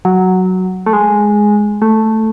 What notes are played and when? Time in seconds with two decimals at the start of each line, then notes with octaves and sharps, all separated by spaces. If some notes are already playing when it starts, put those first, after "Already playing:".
0.05 F#3
0.86 A3
0.93 G#3
1.82 A3